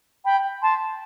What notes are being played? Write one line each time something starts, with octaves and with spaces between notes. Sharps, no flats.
G5 B5
A5 C6